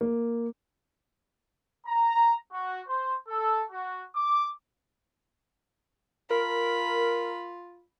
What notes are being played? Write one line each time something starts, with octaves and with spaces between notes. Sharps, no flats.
A#3
A#5
F#4
C5
A4
F#4
D6
F4 A#4 B5